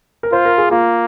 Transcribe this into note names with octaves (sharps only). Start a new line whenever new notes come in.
A#4
F4 C5
A#4
G#4
A#3 F4